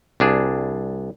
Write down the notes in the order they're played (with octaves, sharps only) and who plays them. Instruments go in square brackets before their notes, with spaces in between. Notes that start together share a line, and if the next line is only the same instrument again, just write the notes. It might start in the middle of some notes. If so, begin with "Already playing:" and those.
[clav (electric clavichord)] C2 D4 G#4